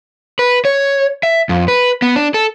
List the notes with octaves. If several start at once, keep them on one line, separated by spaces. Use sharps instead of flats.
B4
C#5
E5
F2
B4
B3
D4
A4